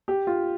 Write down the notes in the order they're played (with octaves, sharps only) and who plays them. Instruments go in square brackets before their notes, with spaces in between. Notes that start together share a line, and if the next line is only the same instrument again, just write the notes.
[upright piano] G4
F4